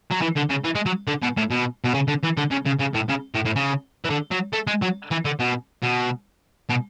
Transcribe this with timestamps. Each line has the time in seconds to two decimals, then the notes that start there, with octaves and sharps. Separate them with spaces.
0.11 F#3
0.21 E3
0.36 D3
0.49 C#3
0.64 E3
0.75 G#3
0.86 F#3
1.08 D3
1.22 B2
1.37 A2
1.51 B2
1.84 B2
1.94 C#3
2.08 D3
2.23 E3
2.37 D3
2.51 C#3
2.66 C#3
2.80 C#3
2.95 A2
3.09 C#3
3.34 A2
3.45 A2
3.56 C#3
4.05 E3
4.10 D3
4.31 F#3
4.53 A3
4.67 G#3
4.82 F#3
5.11 E3
5.25 D3
5.40 B2
5.83 B2
6.69 B2